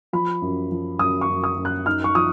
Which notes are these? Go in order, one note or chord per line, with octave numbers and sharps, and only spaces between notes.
F3 B5
F#2
F3
F#2 D#6
C#6
F#2
D#6
F#2
F#6
D#4 F6
C#6
F3 D#6